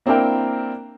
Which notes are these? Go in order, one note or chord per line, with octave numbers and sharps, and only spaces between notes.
A#3 C4 D4 E4 A#4 G5